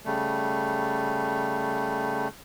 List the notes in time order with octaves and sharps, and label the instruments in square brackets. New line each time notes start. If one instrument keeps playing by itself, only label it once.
[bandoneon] C#3 G3 A3